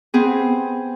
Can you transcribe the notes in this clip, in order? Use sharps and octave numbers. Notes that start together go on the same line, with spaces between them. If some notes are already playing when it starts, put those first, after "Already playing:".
B3 C4 G#4